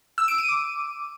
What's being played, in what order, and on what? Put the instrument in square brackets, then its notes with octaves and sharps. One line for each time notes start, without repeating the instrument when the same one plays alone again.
[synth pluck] E6
D7
D#7
D6